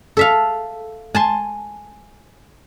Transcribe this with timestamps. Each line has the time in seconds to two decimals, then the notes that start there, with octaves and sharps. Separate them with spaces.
0.17 A4 E5 F5
1.15 G#5 A5 C6